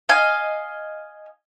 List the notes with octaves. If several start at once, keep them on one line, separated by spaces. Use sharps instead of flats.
D#5 F5 G#5